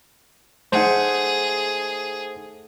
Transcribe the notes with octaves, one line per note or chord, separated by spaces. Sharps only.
A3 D#4 G#4 C5 F#5